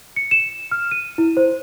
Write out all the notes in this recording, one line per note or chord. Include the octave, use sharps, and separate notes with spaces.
C#7
E7
F6
D#7
E4
C5